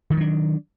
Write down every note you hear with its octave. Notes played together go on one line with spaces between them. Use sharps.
D#3 F3 F#3 D4